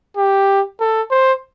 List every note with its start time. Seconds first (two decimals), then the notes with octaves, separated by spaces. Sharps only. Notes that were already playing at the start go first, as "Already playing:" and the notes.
0.17 G4
0.80 A4
1.11 C5